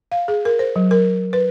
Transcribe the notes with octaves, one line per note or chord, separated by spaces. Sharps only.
F5
G#4
A#4
C5
F#3
A#4
B4